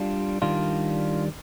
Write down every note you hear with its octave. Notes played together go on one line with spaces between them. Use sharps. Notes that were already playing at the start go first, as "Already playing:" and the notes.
Already playing: G3 D4 F4
D#3 G3 D4 F4